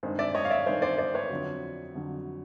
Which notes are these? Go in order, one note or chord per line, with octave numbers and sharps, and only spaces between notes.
G2 D#3 G#3 C4
D5 E5
C#5 D#5
F5
D5 E5
G2 D#3 G#3 C4 C5 D5
C5 D5
C5 D5
B4 C#5
F2 D3 F#3
F2 D3 F#3